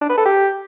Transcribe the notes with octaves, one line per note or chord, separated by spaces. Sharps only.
D4
B4
A4
G4